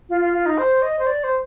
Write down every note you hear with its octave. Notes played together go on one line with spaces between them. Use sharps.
F4
F4
F4
D#4
C5
D#5
C5
D5
C5